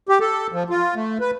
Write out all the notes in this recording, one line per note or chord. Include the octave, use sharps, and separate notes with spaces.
G4
A4
F3
F4
A3
B4